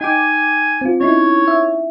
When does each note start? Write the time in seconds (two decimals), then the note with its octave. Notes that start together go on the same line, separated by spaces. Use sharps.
0.01 D#4 G5 G#5 D6
0.81 C4 F4
1.01 C#4 D#4 E4 C#5
1.48 E5